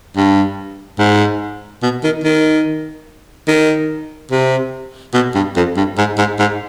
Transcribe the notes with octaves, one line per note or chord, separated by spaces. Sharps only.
G2
G#2
B2
D#3
D#3
D#3
C3
B2
G2
F2
G2
G#2
G#2
G#2